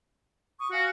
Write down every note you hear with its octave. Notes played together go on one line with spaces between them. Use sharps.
C#6 D#6
F#4 F5 G#5